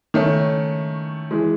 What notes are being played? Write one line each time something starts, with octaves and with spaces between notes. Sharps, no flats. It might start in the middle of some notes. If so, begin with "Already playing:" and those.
D#3 A3 C#4
E3 G#3